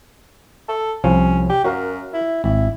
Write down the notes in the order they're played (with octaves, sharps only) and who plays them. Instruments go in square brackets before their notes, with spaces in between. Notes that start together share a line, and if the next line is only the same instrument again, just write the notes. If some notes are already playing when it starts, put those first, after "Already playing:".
[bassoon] A4
[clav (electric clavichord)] C2 F3 [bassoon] C#4
[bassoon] G4
[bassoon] F#2 [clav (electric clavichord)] F#4 A#4 F5
[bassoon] E4
[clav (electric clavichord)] G#1 [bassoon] E4